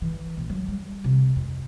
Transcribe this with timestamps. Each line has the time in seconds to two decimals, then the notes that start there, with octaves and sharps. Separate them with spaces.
0.02 E3
0.37 A#1
0.49 F#3
0.68 G3
1.04 C3
1.36 F2